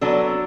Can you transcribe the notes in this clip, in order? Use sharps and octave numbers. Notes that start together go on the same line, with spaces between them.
F#3 B3 D4 A4